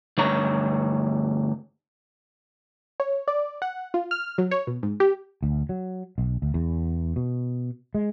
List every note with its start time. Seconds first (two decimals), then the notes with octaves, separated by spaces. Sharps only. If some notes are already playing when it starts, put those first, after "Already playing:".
0.17 D2 G2 C#5 A#5
3.00 C#5
3.28 D5
3.62 F#5
3.94 F4
4.11 F6
4.38 F#3
4.51 C#5
4.67 B2
4.83 G#2
5.00 G4
5.43 D2
5.69 F#3
6.18 B1
6.42 D2
6.54 E2
7.16 B2
7.95 G#3